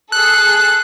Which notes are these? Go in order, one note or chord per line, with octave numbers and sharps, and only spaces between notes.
G#4 A4 F#6